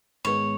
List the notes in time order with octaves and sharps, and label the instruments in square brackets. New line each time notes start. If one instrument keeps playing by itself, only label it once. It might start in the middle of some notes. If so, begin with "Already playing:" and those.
[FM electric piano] G#2 D#3 G#3 B3 [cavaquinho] C#5